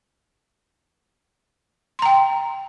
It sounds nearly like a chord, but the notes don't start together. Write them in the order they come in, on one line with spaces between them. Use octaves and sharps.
C6 A#5 G5